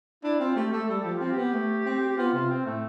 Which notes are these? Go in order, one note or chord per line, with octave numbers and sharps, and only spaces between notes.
D4 E4
C4 F4
A3 G4
A3 A4
G3 A4
F3 G4
C4 F4
G4
B3
A3
C4
G4
B3 F4
C3 F4
C4
A2 A3